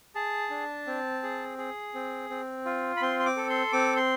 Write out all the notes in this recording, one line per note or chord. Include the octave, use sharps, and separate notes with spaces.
G#4 A5
D4
C4
G#4
G#4
C4
C4
F4
B5
C4 C6
C6
D6
A4
C6
C4 D6
C6